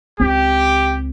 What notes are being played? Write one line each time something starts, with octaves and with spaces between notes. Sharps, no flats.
C#2 C4 G4